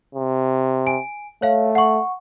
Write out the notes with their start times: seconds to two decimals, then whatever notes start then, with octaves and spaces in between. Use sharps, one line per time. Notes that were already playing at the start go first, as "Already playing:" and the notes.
0.15 C3
0.87 G#5 D7
1.42 A3 C#5 F5
1.75 F#5 C#6